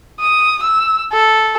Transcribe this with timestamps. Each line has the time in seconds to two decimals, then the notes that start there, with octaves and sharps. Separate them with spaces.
0.20 D#6
0.62 E6
1.12 A4